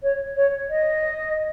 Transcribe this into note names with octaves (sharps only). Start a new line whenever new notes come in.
C#5
C#5
D#5